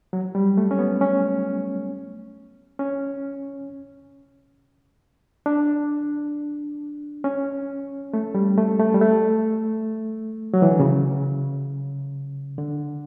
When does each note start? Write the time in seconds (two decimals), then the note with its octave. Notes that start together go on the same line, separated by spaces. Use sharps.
0.13 F#3
0.35 G3
0.57 A3
0.71 C#4
0.79 B3
1.01 C#4
2.79 C#4
5.46 D4
7.24 C#4
8.14 A3
8.35 G3
8.57 A3
8.80 A3
8.94 G3
9.01 A3
10.54 F#3
10.62 E3
10.71 D3
10.80 C#3
12.58 D3